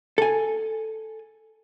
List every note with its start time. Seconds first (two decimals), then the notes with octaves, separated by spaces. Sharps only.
0.18 A4 G#5